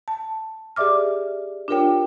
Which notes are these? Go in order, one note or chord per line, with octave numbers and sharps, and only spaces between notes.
A5
G4 G#4 D5 E5 D6 F6
D4 F4 G4 A#4 C#5 G5